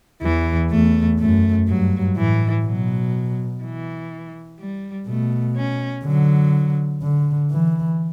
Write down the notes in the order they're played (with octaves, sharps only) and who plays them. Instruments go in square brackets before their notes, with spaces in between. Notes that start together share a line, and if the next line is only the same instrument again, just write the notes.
[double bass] E2 [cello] E3
[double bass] E2 [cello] A3
[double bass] F#2 [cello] A3
[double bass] G2 [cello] F#3
[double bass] A2 [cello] E3
[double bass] B2 [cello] F#3
[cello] E3
G3
[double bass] B2 [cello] A3
[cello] C#4
[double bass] D3 [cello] F#3
[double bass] D3
E3